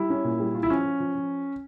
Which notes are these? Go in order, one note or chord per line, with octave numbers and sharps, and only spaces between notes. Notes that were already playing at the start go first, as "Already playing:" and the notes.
Already playing: G3 E4
C#4
A#2
G3
F4
E4
F3 C#4
F4
F3
F3